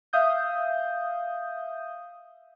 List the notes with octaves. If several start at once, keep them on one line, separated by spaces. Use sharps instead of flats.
E5 F5 D#6 G6